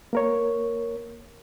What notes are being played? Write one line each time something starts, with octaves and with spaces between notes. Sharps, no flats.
A#3 A#4 C#5